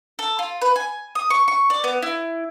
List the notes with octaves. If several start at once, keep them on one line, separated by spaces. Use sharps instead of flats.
A4
F4
B4
G#5
D#6
C#6
C#6
D5
B3
E4